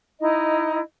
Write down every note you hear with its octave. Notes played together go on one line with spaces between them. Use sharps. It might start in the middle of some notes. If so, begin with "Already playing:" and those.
D#4 E4 D#5